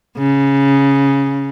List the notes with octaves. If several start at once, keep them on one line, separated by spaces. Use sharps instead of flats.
C#3